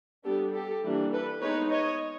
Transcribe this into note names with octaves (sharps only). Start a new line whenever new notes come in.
G3 B3 D4 G4 A4
G4 A4
E3 G3 A#3 D4
A4 B4
G#3 B3 D#4 B4 C#5
C#5 D#5